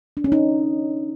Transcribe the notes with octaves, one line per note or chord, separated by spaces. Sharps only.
D4
C#4
D#4